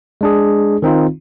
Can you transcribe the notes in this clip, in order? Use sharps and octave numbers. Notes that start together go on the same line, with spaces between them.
G#3 D4 G#4
D#3 C4 D#4 F4